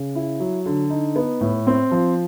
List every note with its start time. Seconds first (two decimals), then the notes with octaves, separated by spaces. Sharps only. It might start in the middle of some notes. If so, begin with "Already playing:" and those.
Already playing: C#3
0.15 E4
0.40 F#3
0.66 D3
0.90 D#4
1.16 B3
1.41 A2
1.67 C4
1.91 F3